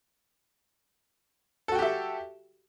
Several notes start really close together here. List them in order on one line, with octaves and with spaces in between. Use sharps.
A4 F#4 G5 G4 E5